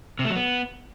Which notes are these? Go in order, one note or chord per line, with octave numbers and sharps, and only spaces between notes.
C3
A3
F#3
B3